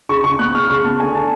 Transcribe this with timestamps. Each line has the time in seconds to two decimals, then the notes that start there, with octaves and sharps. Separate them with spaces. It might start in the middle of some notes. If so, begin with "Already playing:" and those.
0.09 C#3 C#6
0.24 C#3 C#6
0.39 B3 F#6
0.54 C#3 F6
0.70 C#3 C#6
0.85 B3 A5
1.00 D3 G#5
1.15 D3 A5